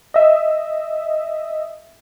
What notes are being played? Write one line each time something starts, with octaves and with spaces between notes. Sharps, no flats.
D#5 E5